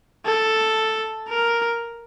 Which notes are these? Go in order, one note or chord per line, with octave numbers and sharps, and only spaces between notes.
A4
A#4